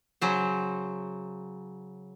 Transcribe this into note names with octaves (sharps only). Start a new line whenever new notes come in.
C#3 F#3 C5